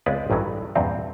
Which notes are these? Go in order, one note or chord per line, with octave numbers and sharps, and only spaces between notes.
C#2 G#3 B3 C4 B4 D5
A1 G2 D#3 E3 F#3
E2 G2 A#2 C4